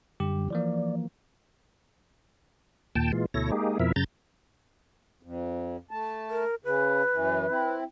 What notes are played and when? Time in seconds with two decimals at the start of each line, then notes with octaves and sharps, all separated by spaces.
0.20 F#2 D3 G3 G4
0.50 E3 F3 A#3 D5
2.96 D#2 A#2 G5 A5
3.12 A#2 E3 G#3 F4
3.34 D2 B2 E4 A4 C#5 A#6
3.52 G#3 A#3 D#4 G4 G#4
3.80 F2 B2 F3 E4 A#4 E5
3.96 F#2 C#3 A#5 G6 A6
5.23 F2
5.91 A3 A5
6.30 A#4
6.65 C#3 B4
7.12 F#2 E3
7.49 C4 E4